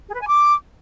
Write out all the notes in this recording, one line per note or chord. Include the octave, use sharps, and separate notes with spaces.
G#4
B4
G#5
D6